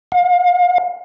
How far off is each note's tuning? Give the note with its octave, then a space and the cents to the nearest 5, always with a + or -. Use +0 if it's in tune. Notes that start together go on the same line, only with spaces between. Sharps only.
F5 +35